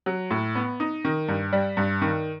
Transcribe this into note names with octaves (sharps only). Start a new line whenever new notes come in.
F#3
A2
B3
D#4
D#3
G2
G3
G2
D#3